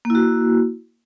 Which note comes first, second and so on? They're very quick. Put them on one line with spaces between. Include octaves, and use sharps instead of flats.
A#3 E4 F#4